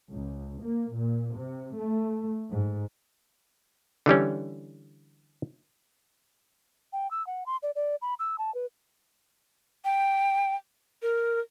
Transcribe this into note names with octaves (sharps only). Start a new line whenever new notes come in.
C#2
A#3
A#2
C3
A3
G#2
D3 E3 G3 C#4
G5
E6
F#5
C6
D5
D5
B5
E6
A5
B4
G5
A#4